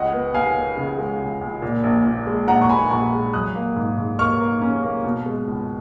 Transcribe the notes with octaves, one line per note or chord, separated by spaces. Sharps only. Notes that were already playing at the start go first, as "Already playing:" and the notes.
Already playing: C#2 D#5 F#5
B3
B3 F5 G#5
B3
C#3
G#3
C#2
C#2
A#2
A#1
A#2
G#3
A#1 F#5 A#5
C#6
A#1 G#5 B5
A#1 A#5 C#6
G#3
F#3 D#6 F#6
A#3
G#2
G#2
A#3 C#6 F6
A#3
C#4
A#3
B2
G#3
C#2